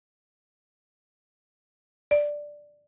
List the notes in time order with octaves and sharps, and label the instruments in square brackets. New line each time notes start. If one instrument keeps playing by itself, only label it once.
[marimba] D5